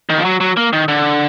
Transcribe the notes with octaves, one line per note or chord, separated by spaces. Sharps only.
D#3
F3
F#3
F#3
A#3
D#3
D3